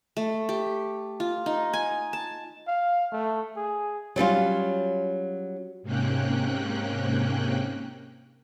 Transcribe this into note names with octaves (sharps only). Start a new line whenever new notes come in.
A3
G4
F4
D#4
G#5
A5
F5
A3
G#4
F#3 G3 C#4 F4
G#2 C3 A#3 C#4 G5 F#6